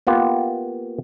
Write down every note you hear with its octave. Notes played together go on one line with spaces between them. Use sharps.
A#3 B3 F4 G4